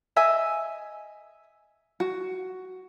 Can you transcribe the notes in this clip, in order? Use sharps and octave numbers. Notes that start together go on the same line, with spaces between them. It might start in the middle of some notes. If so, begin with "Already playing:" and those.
D#5 E5 G#5
F#4